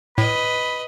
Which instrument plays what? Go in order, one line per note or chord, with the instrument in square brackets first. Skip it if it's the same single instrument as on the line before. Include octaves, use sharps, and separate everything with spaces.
[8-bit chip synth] A2 [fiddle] B4 D#5 [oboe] B5